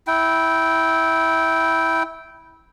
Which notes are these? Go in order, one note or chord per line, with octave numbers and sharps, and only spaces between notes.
E4 G5